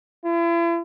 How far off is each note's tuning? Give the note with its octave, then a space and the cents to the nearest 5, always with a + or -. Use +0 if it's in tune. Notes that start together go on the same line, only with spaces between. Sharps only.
E4 +40